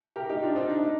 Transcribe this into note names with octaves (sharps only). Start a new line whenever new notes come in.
G4 A#4
D#4 G4
D4 F4
C4 D#4
D4
D#4